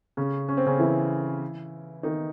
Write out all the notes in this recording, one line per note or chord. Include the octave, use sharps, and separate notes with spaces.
C#3 C#4
C#4
C4
C#3 C#4
E3 E4
D#3 D#4